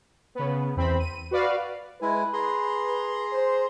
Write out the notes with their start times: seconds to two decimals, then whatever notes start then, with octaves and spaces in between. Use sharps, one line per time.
0.35 C#3 B3
0.76 E2 C4 B5
1.00 D#7
1.31 F#4 B4 D5 F5
2.02 G#3 E4 B4 G#5
2.33 G#4 A#5 C6
3.33 C5